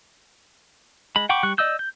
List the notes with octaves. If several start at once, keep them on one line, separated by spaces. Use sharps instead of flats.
G#3 B5
F#5 G5 B5 C#6 D6
G3 C#6 F#6
D5 D#5 D#6 E6 G6
G6